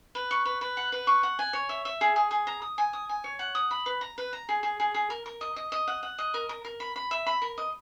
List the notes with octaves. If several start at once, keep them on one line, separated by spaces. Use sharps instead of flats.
B4
C#6
B4
B4
F#5
B4
C#6
F#5
G#5
C#5
E5
E5
G#4
G#4
G#4
A#5
D#6
G#5
D#6
G#5
C#5
F#5
D#6
B5
B4
A#5
B4
A#5
G#4
G#4
G#4
G#4
A#4
A#4
D#5
D#5
D#5
F#5
F#5
D#5
A#4
A#4
A#4
B5
B5
E5
B5
A#4
D#5